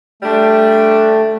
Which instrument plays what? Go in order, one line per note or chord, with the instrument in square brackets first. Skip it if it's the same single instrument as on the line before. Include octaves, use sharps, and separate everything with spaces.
[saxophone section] D3 G3 D4 [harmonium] A3